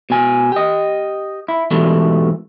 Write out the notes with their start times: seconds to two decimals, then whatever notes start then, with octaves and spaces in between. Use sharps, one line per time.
0.10 B2 G#5
0.52 G4 D#5
1.48 E4
1.71 G#2 B2 E3 G3 A3